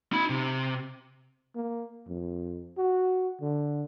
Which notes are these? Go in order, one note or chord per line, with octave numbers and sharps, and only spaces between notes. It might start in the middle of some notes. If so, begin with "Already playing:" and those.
D#4 B5
C3
A#3
F2
F#4
D3